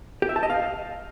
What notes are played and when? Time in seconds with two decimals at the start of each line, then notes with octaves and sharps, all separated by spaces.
0.22 G4
0.29 E5
0.36 A5
0.43 D#5
0.50 F5